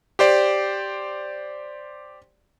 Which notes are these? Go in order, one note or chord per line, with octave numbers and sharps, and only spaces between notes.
G4 C5 D5